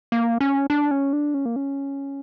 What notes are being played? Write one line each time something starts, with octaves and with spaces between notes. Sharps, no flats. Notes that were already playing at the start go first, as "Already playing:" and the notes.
A#3
C#4
D4
C#4
D4
C#4
A#3
C#4